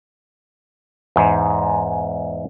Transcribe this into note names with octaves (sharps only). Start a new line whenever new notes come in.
E2 G#2